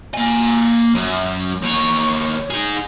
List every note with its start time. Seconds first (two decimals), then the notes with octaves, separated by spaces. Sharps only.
0.14 A#3 G#5
0.95 F#2
1.62 D#2 C#5
2.50 D#4 G#4